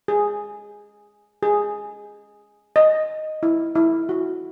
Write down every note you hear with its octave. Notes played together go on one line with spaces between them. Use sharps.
G#4
G#4
D#5
E4
E4
F#4